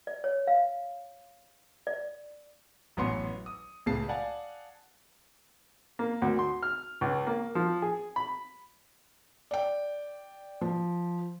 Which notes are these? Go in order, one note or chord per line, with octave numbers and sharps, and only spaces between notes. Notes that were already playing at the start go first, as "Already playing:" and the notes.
D5
C#5
F5
D5
A1 F#2 B3 C#5 C6 C#7
D#6
C#2 A2 G#4 A5 C7
D5 F5 F#5 G#5 A5
A#3
D2
C6
F6
C#2
A#3
F3
G#4
B5
D5 G5
F3